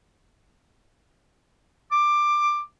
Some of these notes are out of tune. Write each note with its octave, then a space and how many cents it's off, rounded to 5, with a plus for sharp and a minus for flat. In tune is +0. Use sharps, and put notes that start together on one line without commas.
D6 +15